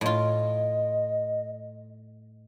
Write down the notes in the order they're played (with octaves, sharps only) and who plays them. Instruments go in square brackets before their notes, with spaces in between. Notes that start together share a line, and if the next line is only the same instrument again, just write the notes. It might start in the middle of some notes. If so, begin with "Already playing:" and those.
[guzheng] A2 F4 [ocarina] D#5